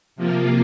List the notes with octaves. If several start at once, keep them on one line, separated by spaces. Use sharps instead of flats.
C3 F3 A#3 F4